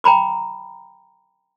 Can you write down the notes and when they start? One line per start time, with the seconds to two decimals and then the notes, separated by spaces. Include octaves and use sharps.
0.04 G5 A#5 B5 D6